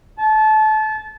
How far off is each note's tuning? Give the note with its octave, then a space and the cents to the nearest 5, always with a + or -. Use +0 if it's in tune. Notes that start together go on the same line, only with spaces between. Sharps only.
A5 -25